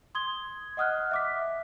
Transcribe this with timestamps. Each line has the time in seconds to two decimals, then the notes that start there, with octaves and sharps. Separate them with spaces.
0.15 C6 D#6 G#6 G7
0.77 D#5 F#5 D#6 F6 F#6
1.11 E5 D6 B6